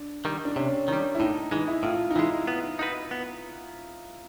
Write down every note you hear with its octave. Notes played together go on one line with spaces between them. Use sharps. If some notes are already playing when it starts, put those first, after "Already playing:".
Already playing: D4
D#3 G3
D4
C3 C#4
D#3 G3 D4
E4
A2 D#4
E3 G#3 D#4
E4
A2 F4
D#4
E3 G#3 E4
B3
D#4 F#4 B4
B3